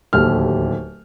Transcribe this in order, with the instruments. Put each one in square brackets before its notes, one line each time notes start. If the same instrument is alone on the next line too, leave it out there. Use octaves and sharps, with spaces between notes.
[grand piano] D1 D#2 G4 A4 F6